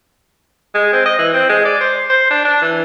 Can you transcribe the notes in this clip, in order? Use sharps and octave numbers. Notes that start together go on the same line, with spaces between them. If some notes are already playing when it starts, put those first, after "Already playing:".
G#3
C4
D#5
E3
C4
G#3
D5
C5
C5
D4
D4
E3